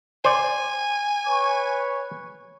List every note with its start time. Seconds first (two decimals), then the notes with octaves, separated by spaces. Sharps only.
0.25 C5 D5 G#5
1.27 B4 C#5 C#6